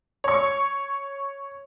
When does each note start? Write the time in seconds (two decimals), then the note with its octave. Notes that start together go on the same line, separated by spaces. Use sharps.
0.24 C#5 C#6